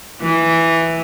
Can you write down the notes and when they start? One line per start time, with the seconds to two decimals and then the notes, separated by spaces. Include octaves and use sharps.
0.22 E3